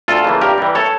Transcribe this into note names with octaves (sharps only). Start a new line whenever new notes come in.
D2 F4 A4
C#3 E3 A#3
G2 G4 A#4
E3 G3
A4 C#5